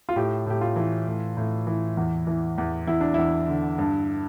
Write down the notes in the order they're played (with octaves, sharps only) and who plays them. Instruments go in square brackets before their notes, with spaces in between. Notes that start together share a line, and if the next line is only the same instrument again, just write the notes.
[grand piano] F4
A2 G4
A2 G4
F4
E3
A2
A2
E3
E2
E3
E2
E2 E4
D4
E2 E4
D3
G2